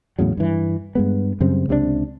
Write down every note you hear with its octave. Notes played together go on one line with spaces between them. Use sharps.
E2 A2 C#3 F#3
G2 E3
G2 G#3 B3
F#2 C#3 G3 C4
C#2 C3 D#3 D4